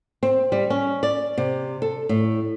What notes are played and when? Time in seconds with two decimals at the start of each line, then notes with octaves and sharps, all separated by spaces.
0.23 C4
0.52 G3
0.70 C#4
1.03 D5
1.38 C3
1.82 A4
2.09 A2